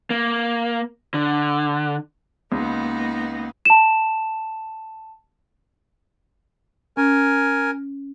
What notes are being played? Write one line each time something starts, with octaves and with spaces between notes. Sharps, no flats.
A#3
D3
C#2 A#3 B3 D#4
A5 E7
C#4 A#4 G#5